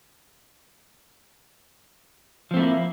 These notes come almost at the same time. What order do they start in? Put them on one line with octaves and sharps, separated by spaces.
F3 C4 A3 E4 A#3